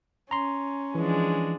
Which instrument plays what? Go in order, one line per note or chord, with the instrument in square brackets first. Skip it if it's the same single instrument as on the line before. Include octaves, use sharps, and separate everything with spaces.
[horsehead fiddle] C#4 [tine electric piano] A#5 C6
[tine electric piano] E3 [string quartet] F3 G#3 D4